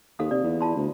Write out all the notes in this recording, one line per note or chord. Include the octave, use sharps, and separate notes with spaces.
D#2 A4 F5 D#6
C3 D5
E2
F4 A5 C6
D2